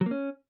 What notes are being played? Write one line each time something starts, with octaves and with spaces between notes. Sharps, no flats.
F#3
A#3
C#4